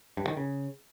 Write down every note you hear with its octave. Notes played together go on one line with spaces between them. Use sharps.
G2
D#3
C#3